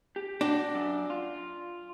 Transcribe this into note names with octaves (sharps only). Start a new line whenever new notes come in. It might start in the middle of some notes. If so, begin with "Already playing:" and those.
G4
D4 F#4 G5
F#2
F4